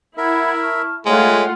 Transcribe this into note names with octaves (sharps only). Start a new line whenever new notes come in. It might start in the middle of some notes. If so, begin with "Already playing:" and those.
E4 A#4 E5 F#5 B5 G#6
A5 C#6 F6
G#3 A3 F4 C#5 E5 F#5 G5 A#5